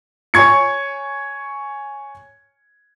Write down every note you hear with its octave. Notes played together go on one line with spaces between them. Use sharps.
C#5 G#5 C#6 G#6 C#7